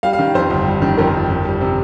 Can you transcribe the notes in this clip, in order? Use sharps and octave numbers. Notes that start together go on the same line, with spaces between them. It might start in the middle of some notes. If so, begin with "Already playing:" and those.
G3 F5
F5
D#3
F2 C5
G1
G3
D#3
F2 A#4
G1
F2
G3
C3